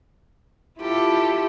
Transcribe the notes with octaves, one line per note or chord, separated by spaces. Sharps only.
E4 F4 G4 A4